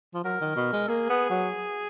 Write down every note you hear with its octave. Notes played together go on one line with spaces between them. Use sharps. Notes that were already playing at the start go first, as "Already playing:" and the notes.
F3
F#3 A#4
D#3
B2
G#3
A#3 G#4
B3
F#3